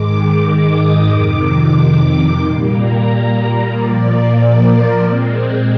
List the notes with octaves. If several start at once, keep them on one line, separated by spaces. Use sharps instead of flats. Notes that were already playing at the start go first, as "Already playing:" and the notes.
Already playing: G#2 D#3 G#3 D6
D6
D#6
F2 C3 D#3 D6
A#2 G3 A#3 C6
A#5
A#2 F3 A#3 D5
A#4
A#2 G#3 C4